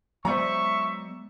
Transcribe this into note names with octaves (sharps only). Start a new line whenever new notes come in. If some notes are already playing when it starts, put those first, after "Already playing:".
F#3 G#3 B3 C5 D5 E5 A#5 C#6